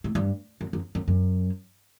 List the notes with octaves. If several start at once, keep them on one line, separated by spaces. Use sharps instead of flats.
A2
G2
F#2
F#2
F#2
F#2